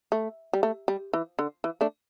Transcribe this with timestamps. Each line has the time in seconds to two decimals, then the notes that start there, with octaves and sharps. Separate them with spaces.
0.12 A3
0.53 G3
0.63 A3
0.88 G3
1.13 E3
1.39 D3
1.64 E3
1.81 A3 D4